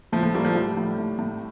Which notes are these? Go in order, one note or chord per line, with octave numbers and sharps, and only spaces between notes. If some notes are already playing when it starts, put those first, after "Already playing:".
A2 F3 A3
F3 A3
A2 G3 A#3
F3 A3
A2 G3
A2
A2
A2